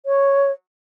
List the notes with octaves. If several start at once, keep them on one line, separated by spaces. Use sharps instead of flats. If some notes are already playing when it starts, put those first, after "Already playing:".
C#5